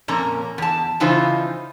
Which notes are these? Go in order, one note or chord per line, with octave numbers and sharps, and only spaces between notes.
F2 A#2 A#3 C#4 A#5
E2 A5
C#3 E3 D#4 F4 C5